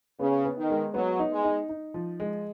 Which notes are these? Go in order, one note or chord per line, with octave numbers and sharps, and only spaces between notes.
C#3 B3
B3
D#3
G#3
F#3 B3
D#4
G#3
D#4
D#4
F3
G#3